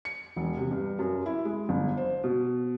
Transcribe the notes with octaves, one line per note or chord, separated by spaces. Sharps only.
C#7
E1
C3
G2
F#2
E4
G#3
G1
C5
B2